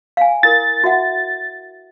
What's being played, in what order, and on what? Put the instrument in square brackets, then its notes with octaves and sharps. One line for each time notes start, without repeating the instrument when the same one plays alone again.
[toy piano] F5 G#5
[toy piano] E4 A#4 [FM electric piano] A6
[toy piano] F#4 E5 F#5